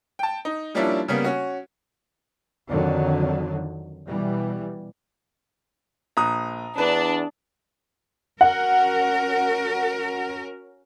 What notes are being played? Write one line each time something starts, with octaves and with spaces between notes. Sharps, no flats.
G5 A5
D#4
F3 G3 A#3 C#4 D4 E4
C#3 G3 A#3 B3
C#4 F#4
F2 D3 D#3 F#3
B2 E3 G3
A#1 A#5 D#6 F#6
E2 D4 B4
C#4 F#4 A#4 F#5